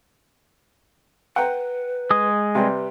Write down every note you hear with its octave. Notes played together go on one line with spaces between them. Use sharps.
B4 F#5 G5 A#5
G#3 D#6
C3 G3 B4